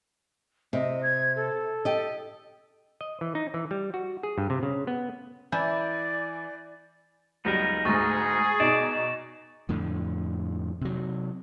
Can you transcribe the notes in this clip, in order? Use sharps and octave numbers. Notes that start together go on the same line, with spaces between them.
C3 D#5
G#6
A4
G4 D#5
D#5
E3
D#4
E3
G3
F#4
G#4
G2
C3
C#3
B3
E3 E4 D5 G#5 G6
C#2 F#3 G3 B3 D#4 A#4
D2 G#2 G#4 C#6 A6 A#6
B2 D#4 D5 E7
F2 A2 D3
C3 F#3